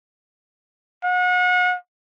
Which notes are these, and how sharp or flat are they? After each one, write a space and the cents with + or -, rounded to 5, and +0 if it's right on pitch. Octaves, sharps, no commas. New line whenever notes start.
F#5 -35